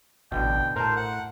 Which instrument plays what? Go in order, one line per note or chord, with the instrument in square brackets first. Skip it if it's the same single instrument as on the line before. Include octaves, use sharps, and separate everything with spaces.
[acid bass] A1 [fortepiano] B2 D3 [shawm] G5
[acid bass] A2 [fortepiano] A#4 A5 [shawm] C5
[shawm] F#5